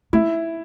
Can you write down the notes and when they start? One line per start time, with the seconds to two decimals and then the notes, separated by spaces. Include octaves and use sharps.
0.13 A3 E4